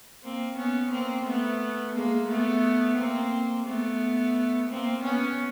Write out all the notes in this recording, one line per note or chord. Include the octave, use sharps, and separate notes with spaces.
A#3 C4
B3 C#4
A#3 C4
A3 B3
G#3 A#3
A3 B3
A#3 C4
A3 B3
A#3 C4
B3 C#4